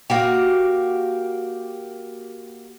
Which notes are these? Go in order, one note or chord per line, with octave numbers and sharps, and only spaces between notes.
A#3 F#4 G4